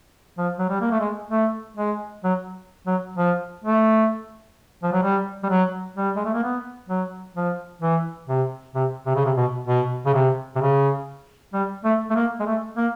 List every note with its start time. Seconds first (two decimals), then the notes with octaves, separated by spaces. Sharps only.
0.38 F3
0.59 F#3
0.69 G3
0.81 A#3
0.91 A3
1.00 G#3
1.31 A3
1.77 G#3
2.24 F#3
2.87 F#3
3.17 F3
3.64 A3
4.83 F3
4.93 F#3
5.03 G3
5.43 G3
5.49 F#3
5.96 G3
6.16 G#3
6.25 A3
6.34 A#3
6.43 B3
6.89 F#3
7.36 F3
7.82 E3
8.28 C3
8.75 C3
9.06 C3
9.15 C#3
9.25 C3
9.37 B2
9.67 B2
10.06 C#3
10.14 C3
10.56 C3
10.61 C#3
11.53 G3
11.85 A3
12.10 A3
12.15 A#3
12.40 G#3
12.46 A3
12.77 A#3